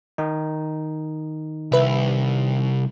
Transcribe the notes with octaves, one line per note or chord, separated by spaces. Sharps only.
D#3 D#4
C2 B4 E5